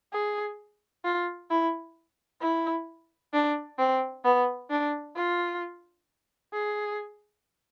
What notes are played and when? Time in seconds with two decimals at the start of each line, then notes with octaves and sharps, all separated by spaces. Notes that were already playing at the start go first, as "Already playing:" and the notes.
0.13 G#4
1.05 F4
1.50 E4
2.42 E4
3.33 D4
3.79 C4
4.25 B3
4.70 D4
5.16 F4
6.53 G#4